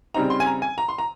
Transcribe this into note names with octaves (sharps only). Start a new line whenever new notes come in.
C#3 G3 C4 D#4 A#5
C6
G#5
A#5
G#5
A#5
C6
A#5